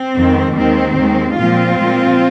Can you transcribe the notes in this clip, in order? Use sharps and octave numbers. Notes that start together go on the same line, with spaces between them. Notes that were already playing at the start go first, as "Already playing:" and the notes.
Already playing: C4
F2 D#3 G#3
D#2 D#3 G#3 C4
D#2 D#3 G#3
A#2 F3 G#3 C4 F4
A#2 F3 G#3